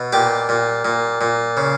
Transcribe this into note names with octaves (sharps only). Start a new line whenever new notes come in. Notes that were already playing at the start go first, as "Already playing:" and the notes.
Already playing: B2
A#2 G4
A#2
A#2
A#2
C#3